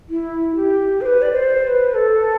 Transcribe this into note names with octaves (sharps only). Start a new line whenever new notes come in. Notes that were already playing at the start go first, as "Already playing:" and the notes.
E4
G4
C5
B4
D5
C5
C5
B4
A4